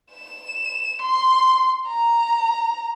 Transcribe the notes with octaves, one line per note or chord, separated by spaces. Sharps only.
E7
C6
A#5